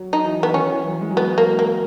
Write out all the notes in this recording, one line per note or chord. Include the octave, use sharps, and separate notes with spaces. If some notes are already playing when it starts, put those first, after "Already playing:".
Already playing: F#3
D#4
E3
B3
D#3 C#4
E3
F#3
G#3
F#3
G#3 B3
A#3
A#3